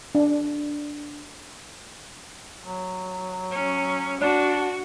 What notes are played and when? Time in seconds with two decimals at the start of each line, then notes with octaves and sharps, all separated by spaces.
0.15 D4
2.61 F#3
3.51 C#4
4.21 D4 F#4